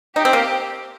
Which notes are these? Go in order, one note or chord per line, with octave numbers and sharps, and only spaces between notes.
D#4 G4
C4
A#3